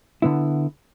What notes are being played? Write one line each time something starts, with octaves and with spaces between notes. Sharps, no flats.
D3 B3 E4